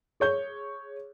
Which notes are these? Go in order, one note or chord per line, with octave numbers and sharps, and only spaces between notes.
G#4 C#5 G6